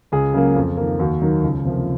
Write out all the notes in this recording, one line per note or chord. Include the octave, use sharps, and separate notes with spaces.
C#2 G#4
C#3 F#3 A#3
F2
D#3 A#3
D#2 F#4
D#3 F#3 A#3
C#2
C3 F3 A#3